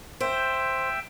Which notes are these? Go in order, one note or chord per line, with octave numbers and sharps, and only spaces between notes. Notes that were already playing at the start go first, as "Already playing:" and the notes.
C5 E5 G5